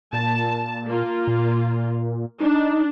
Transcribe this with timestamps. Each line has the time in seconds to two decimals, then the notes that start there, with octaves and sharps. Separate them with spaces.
0.13 A#2 A5
0.86 A#3 F4
1.27 A#2
2.40 D4 D#4